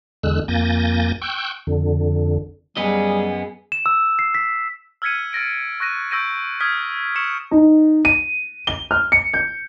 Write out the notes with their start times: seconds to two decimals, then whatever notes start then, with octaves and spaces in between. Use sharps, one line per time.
0.23 E2 D3 G#3 E6 F#6
0.48 F2 A#3 G#5 G6 A6 A#6
1.22 G5 C#6 E6 F#6 G6
1.67 F2 D3
2.77 F#2 G3 B3 G#4 D#5
3.72 E7
3.86 E6
4.19 C7
4.35 B6
5.02 E6 F6 G#6 B6 C#7 D#7
5.33 F6 A6 A#6 D7
5.80 C#6 F#6 A#6 D#7
6.11 C#6 E6 G6 A#6 D7 D#7
6.60 D#6 F6 G#6 B6
7.16 C#6 E6 C#7 E7
7.51 D#4
8.05 D#7
8.67 G7
8.91 F6
9.12 C#7
9.33 G6